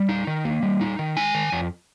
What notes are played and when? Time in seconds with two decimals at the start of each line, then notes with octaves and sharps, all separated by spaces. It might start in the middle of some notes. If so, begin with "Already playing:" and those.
Already playing: G3
0.09 D#4
0.27 D#3
0.45 A#3
0.63 G3
0.81 D#4
0.99 D#3
1.17 G#3 G#5
1.35 D#3
1.52 F2